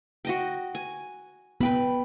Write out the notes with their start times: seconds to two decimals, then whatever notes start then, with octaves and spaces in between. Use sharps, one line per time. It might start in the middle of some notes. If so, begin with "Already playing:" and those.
0.25 F#4 D#5 G5
0.75 G#5
1.61 B3 B4 G5 B5